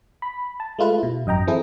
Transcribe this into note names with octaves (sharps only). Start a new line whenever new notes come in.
B5
A5
G#3 A3 F4 B4
B2 E4
G#1 F#2 D#5 G5 A#5
E3 C4 E4 G#4 A4